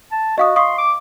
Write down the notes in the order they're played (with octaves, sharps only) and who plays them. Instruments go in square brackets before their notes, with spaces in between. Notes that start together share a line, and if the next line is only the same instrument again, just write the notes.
[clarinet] A5
[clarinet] F#4 [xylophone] D#5 F5 D#6
[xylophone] F5 C#6 D#6 [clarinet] C6
[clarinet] D6